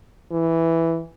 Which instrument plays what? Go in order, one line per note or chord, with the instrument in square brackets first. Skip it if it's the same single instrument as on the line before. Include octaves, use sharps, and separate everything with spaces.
[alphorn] E3